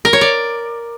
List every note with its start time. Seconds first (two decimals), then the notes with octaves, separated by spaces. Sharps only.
0.05 A#4
0.13 C#5
0.21 D5